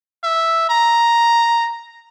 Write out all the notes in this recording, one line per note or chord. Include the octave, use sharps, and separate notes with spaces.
E5
A#5